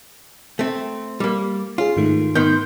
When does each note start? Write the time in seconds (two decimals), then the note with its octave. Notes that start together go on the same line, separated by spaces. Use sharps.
0.59 A3 C4
1.20 G3 A#3
1.78 C#4 F4 G#4
1.97 G#2 D#3 A3
2.35 D#3 B3 C6 G6